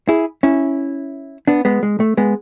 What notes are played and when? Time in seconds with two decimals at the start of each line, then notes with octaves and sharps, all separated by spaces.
0.09 E4 G#4
0.43 C#4 E4
1.47 B3 D4
1.65 G#3 B3
1.83 G#3
2.00 A3
2.17 G#3 B3